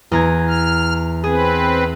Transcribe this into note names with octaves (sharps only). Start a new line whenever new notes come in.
E2 A#5 G#6
F6
C4 G#4 B4